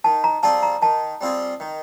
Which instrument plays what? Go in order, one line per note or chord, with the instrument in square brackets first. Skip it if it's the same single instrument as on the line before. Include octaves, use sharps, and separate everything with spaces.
[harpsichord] D#3 [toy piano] A5
[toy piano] A#5
[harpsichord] G3 C4 F4 G#4 [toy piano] A5
[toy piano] A#5
[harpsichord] D#3 [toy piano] A5
[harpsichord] G3 C4 F4 G#4
D#3